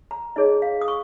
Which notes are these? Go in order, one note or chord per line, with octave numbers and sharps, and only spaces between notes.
A#5
D#4 G#4 C#5 D#5
F5
D#6
C#6